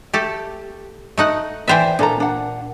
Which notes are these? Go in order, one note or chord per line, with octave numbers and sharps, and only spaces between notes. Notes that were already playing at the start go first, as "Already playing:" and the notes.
A3 G4 A4
A3 D#4 F#5
E3 B4 C5 D5 E5 G5
A#2 D4 A4 A#5
D4 F#5